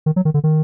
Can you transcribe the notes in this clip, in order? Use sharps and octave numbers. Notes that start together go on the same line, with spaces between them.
D#3
F#3
D#3
D3
D#3